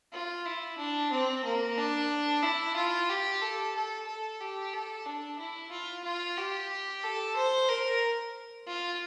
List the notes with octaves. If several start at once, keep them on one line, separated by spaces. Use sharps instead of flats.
F4
E4
D4
C4
A#3
D4
E4
F4
G4
A4
A4
A4
G4
A4
D4
E4
F4
F4
G4
A4
C5
A#4
F4